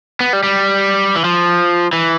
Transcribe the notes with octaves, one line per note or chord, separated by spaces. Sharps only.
B3
G3
G3
E3
F3
E3